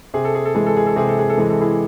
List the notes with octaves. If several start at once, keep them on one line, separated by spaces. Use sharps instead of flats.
C3 G#4
A4
G#4
A4
E3 G#3 G#4
A4
G#4
A4
C3 G#4
A4
G#4
A4
E3 G#3 G#4
A4
E4 G#4